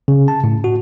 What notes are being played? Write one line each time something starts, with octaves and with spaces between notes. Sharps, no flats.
C#3
A5
A2
F#4